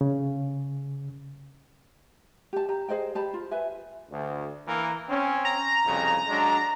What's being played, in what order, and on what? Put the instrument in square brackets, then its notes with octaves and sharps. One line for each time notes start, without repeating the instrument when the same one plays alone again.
[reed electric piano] C#3
[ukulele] G4 A5
G4 A#5
G#4 C5 D#5 G5
G4 A5 B5
F4
B4 E5 G#5
[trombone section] D2
E3 A#3 A#4
C4 C#4
[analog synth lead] A#5
[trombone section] C2 F2 C#3
F#3 G#3 D4